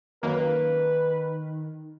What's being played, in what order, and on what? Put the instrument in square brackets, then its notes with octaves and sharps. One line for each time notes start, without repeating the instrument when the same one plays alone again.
[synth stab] F#2 A#3 [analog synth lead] D#3 [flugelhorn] B4